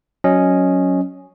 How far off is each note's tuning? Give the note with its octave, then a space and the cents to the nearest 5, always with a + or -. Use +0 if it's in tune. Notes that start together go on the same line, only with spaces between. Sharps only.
F#3 +0 C#4 +0 D#5 +0